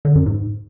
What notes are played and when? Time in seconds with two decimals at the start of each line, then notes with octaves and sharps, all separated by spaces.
0.05 D3
0.15 F#2
0.26 G#2